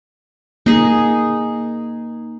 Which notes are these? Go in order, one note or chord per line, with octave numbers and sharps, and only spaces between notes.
A#3 D#4 G#4